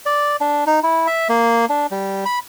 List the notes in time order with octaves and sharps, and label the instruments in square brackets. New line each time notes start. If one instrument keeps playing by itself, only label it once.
[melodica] D5
D4
D#4
E4
E5
A#3
D4
G3
B5